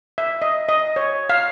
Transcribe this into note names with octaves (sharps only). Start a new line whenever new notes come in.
E5
D#5
D#5
C#5
F5